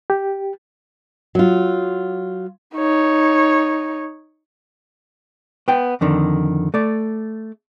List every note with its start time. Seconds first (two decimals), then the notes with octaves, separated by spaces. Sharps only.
0.10 G4
1.35 F#3 F4
2.76 D#4 C#5
5.68 B3 G5
6.01 F2 D3 D#3
6.74 A3 D5